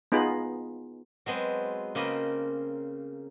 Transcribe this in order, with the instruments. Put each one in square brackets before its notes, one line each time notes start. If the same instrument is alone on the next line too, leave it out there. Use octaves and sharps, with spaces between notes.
[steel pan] B3 D#4 F4 G#4 B5
[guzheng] F#3 G#3 B3 C4
C#3 A#3 C4 D#5 B5